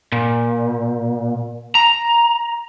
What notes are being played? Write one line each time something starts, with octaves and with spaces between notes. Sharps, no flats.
A#2
A#5